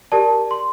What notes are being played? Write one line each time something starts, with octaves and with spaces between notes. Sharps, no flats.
G4 A#4 D5 A5
C6